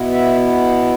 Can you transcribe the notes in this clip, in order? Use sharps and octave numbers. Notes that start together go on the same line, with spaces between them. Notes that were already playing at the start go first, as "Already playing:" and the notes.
Already playing: B2 B3 E4
E5